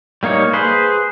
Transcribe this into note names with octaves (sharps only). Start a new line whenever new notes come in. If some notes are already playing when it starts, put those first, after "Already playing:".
G3 A#3 D#4 C#5
G#4 B4 C5